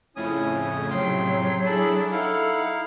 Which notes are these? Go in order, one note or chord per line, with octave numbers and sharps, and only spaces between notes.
F2 A2 C#3 C#4 E4 G#5 D#6
C3 F#3 G5 C6
D4 E4 G#4 A4 A5 B5
D#4 E4 A4 F5 F#5